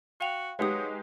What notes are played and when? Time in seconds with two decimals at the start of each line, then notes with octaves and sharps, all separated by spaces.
0.21 F#4 F5 G5 F7
0.59 F#3 G#3 D#4 G4 B4 D#6